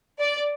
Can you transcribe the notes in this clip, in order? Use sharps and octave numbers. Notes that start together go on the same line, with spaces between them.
D5